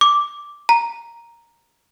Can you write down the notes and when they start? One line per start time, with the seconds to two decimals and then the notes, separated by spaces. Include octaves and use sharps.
0.01 D6
0.69 A#5